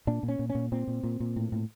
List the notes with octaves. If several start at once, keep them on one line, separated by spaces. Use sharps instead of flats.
A#2 D4
A#2
C#4
A#2
C#4
A#2
A#2 C4
A#2
A#2
A#2
A2
A2